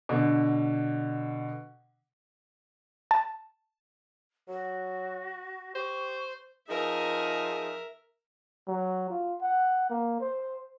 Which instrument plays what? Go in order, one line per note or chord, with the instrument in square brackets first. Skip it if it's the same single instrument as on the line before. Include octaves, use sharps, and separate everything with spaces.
[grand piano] B2 D3
[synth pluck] A5
[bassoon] F#3 [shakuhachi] F#4
[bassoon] G4 [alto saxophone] C5 [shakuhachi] C#6
[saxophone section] F3 D#4 G#4 [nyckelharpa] A#4 E5
[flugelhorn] F#3
F4
F#5
A#3
C5